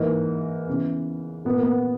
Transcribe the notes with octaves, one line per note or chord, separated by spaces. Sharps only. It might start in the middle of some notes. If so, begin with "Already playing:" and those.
Already playing: G#2 E3 A#3
E2 C#3 E3
A#2 B3
A#3
B3